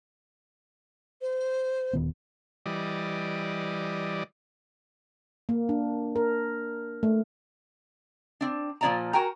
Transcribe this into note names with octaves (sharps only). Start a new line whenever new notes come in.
C5
D#1 D#3 B3
E3 G3 D5 D#5
A#3
D4
A#4
A3
C4 D4
A#2 F3 E4 D5 A5 A#5
F#4 A#4 G5 G#5 A#5